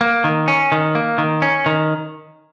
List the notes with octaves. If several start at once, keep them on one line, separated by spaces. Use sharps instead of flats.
A#3
D#3
C#4
D#3
A#3
D#3
C#4
D#3